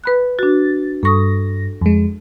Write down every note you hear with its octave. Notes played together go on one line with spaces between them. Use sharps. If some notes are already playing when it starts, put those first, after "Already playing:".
B4 B5 F#6
D4 F#4 A6
G2 A4 C#6 D#6 A#6
F2 G#3